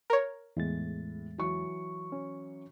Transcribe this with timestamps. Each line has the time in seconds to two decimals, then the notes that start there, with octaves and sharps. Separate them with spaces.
0.10 A#4 C#5
0.57 E2 A2 G#3 A6
1.38 E3 F#3 C#6
2.12 C#4